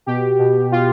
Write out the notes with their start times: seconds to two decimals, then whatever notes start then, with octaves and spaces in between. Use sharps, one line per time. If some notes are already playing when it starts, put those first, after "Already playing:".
0.06 B2 G4
0.39 B2
0.70 B2 F4